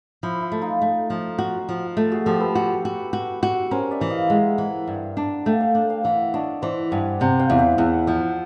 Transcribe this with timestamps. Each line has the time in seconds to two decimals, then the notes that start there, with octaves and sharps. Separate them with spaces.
0.23 F3 E4
0.42 E4
0.52 A3
0.62 D#4 F4
0.82 A3
1.10 F3
1.39 F#4
1.69 F3
1.97 A3
2.12 F#4 G#4
2.26 F3 G4 A4
2.40 A4 B4
2.55 F#4
2.85 F#4
3.13 F#4
3.43 F#4
3.71 C#4 A#4 C5
3.91 D5 E5
4.01 E3
4.10 D#5 F5
4.30 G#3 E5 F#5
4.58 E3
4.87 G2
5.17 D4
5.46 A3 F5 G5
5.60 F5 G5
5.75 D4
5.90 F5 G5
6.04 E3 E5 F#5
6.34 D4 C#5 D#5
6.62 E3 C5 D5
6.91 G2 F#5 G#5
7.20 C3 F#5 G#5
7.39 F5 G5
7.50 E2
7.59 E5 F#5
7.78 E2 E5 F#5
8.07 F3 E5 F#5